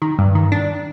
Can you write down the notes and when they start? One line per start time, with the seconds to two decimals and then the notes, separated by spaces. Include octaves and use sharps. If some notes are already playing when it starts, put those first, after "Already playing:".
0.02 D#3
0.19 G2
0.35 D#3
0.52 D4